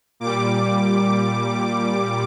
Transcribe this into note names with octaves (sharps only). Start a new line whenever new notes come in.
A#2 G3 D6